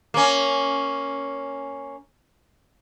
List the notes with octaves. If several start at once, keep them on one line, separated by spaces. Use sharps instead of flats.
A#3 C#4